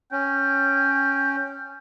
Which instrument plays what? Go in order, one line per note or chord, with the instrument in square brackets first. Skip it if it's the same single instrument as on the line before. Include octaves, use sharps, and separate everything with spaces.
[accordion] C#4 [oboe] G5